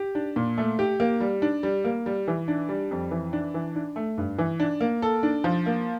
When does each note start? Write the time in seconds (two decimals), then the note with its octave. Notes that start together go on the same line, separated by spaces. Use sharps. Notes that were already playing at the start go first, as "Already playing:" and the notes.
Already playing: G4
0.15 D4
0.36 A#2
0.58 A3
0.79 G4
1.00 A#3
1.20 G3
1.42 D4
1.63 G3
1.85 A#3
2.06 G3
2.28 E3
2.48 D4
2.69 G3
2.91 F2
3.11 E3
3.33 D4
3.54 E3
3.76 D4
3.96 A3
4.18 G2
4.38 E3
4.60 D4
4.81 A#3
5.02 A4
5.23 D4
5.44 F3
5.66 A#3